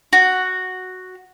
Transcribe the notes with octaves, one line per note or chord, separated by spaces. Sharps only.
F#4